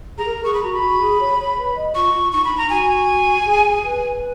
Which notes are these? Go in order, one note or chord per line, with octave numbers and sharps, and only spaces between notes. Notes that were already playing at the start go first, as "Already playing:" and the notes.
G#4 A#5
A#4
G#4 C#6
B5
F#4 A#5
B5
F#4
G#4
C#5
C#5
B4
D#5
F4 C#6
F4
D#4 C#6
B5
D#4
A#5
F#4 G#5
G#4
B4